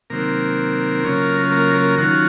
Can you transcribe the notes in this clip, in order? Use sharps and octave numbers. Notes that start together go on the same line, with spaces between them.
C3 D#3 F#3 A#3 C4 A#4
C#3 F#3 C#4 F4
A#3 A#4
A#3 A#4
D#3 F#3 C#4 F4 F#4